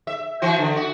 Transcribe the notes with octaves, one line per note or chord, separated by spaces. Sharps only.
E5
E3 F#4 C5
D3
F#4